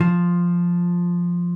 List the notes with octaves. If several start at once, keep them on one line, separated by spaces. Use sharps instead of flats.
F3